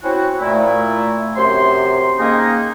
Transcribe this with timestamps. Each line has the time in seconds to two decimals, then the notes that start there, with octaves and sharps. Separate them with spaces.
0.03 C4 C#4 E4 F#4
0.40 A#2 A3 E4
1.36 F#2 C3 C5 C6
2.18 D#3 G#3 A#3 C#4 D#4